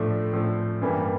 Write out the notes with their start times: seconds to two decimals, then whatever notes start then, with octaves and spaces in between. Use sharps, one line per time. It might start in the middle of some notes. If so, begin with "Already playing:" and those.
Already playing: A2 F3 A3 D4
0.33 A2 F3 A3 D4
0.81 G2 E3 G3 A#3